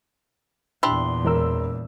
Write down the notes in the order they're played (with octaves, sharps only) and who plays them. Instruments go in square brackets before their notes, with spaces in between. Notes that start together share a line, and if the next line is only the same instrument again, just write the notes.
[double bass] E2 A#2 [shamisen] D4 E4 G4 [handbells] C6
[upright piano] E1 A#4 E6